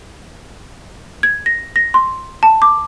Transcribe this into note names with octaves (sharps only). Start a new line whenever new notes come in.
G#6
A#6
A#6
C6
A5
D6